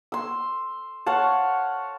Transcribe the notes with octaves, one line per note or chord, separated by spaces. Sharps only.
C6 E6
C#5 F5 F#5 A5